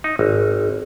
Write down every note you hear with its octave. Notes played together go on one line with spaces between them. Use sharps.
D#4
G#1